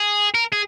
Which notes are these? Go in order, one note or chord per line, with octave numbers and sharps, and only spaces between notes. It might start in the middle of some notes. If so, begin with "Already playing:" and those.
Already playing: G#4
A#4
G#4